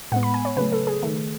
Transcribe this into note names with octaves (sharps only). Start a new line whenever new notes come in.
A2 G#3 B3 F#5
B5
G#5
C#5
C#3 F#3 A3 B4
A4
G#4
D#3 A3